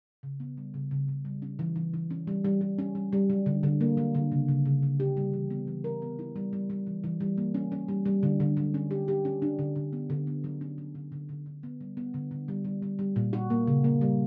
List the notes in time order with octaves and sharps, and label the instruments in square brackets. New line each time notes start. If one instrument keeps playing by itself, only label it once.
[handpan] C#3
B3
G3
C#3
C#3
C#3
G3
C#4
E3
E3
E3
C#4
G3
G3
G3
C#4
G3
G3
F#3
D3
D3
A#3
F#3
D3
C#3
C#3
C#3
C#3
G4
G3
E3
B3
E3
A#4
B3
E4
G3
G3
G3
E3
E3
G3
A#3
C#4
C#4
G3
G3
D3
D3
F#3
C#4
G4
G4
C#4
D4
D3
D3
B3
D3
B3
F#3
C#4
F#3
D3
D3
D3
D3
B3
G3
B3
D3
D3
G3
G3
G3
G3
A#2
F#4
A#3
C#3
A#3
G3